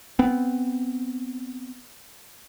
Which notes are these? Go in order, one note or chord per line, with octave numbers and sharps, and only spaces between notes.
B3 C4